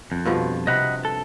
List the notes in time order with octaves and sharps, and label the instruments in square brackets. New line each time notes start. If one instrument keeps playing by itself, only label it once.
[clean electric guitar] F2
[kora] G2 B2 F3
[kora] C3 [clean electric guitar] D#5 F#5 B5
[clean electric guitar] A4